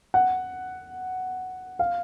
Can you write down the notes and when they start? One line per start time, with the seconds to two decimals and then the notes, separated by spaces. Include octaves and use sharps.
0.14 F#5
1.79 F5